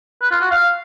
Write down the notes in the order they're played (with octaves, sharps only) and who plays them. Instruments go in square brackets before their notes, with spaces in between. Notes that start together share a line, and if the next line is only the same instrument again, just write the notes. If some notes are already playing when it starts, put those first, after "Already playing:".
[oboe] B4
F4
F#4
F5